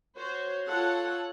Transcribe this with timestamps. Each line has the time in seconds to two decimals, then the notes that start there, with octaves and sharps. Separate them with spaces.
0.16 F#4 C5 C#5
0.67 F4 A4 C#5 F#5